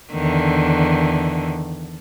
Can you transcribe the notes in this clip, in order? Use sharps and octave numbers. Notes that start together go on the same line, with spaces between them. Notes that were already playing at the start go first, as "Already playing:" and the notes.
E2 D3 D#3